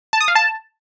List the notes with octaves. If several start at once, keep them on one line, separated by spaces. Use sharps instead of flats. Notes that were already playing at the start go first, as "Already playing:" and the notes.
A5
D#6
F5
A5